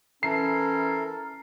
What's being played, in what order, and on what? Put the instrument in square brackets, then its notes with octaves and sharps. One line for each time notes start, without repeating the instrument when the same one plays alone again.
[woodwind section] E3 C#4 [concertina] A4 A#4 [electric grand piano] C7